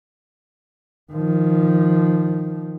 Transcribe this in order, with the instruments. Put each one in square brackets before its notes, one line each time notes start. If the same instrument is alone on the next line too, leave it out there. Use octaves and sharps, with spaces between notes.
[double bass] D#3 F3